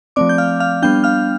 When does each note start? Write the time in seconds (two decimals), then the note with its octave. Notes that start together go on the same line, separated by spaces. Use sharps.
0.16 F3 A3 C4 D5 D6
0.29 G6
0.38 F5 F6
0.60 F5 F6
0.82 G3 B3 D4 G5 G6
1.04 F5 F6